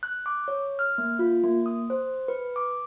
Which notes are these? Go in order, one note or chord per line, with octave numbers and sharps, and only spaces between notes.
F#6
D6
C#5
F6
A#3
F4
A#3
D#6
C5
B4
D6